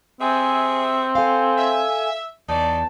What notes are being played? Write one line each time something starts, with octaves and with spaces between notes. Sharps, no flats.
C3 C4 G#4 E5 G#5
A4 F5 G#5
E5
E2 F#3 D#4 D5 A5